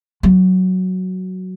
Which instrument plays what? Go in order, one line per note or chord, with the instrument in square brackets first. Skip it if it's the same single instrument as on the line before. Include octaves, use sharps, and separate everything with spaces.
[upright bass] F#3